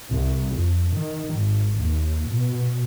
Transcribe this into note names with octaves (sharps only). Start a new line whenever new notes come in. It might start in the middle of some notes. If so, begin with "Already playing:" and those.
C2
F2
D#3
G#1
D#2
B2